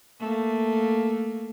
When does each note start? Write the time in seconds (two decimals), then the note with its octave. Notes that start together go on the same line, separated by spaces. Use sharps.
0.20 A3 A#3